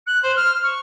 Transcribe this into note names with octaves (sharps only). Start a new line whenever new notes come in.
F#6
C5
F6
C#6